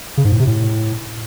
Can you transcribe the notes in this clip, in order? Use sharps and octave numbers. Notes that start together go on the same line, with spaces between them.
C#3
G#2
A2
C3
A2